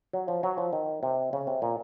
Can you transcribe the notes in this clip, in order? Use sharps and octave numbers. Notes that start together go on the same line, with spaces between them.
F#3
F3
F#3
F3
D#3
C3
C#3
C3
A#2